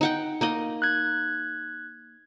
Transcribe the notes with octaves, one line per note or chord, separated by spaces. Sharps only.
D#4 F#5 G5
A#3 D#4 D#5
F#6 G#6